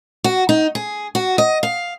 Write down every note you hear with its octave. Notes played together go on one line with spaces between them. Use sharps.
F#4
D#4
G#4
F#4
D#5
F5